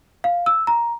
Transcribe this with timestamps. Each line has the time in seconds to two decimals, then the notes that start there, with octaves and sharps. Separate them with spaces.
0.24 F5
0.46 E6
0.67 A#5